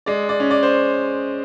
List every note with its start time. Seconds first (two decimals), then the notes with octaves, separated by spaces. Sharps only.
0.06 G#3 D5
0.29 D5
0.40 C#4
0.51 D5
0.63 C5